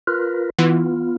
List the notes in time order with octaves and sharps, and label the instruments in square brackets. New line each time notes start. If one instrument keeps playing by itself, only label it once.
[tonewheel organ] F4 A#4 B4
[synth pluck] E3 [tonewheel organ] B3 F4